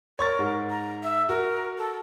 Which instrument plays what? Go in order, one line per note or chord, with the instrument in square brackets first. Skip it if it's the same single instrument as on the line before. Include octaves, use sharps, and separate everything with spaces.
[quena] A#4 [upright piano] C#5 C#6 A6
[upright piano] G#2
[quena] A#5
E5
[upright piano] F#4 [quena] A#4
[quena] A4